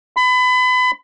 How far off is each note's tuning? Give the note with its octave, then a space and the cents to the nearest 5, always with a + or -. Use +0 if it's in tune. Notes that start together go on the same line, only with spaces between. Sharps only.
B5 +30